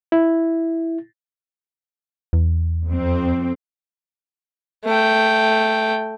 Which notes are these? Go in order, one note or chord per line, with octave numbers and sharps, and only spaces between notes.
E4
E2
F2 C4
A3 G5